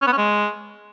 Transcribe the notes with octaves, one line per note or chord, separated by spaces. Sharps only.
C#4
B3
C#4
G#3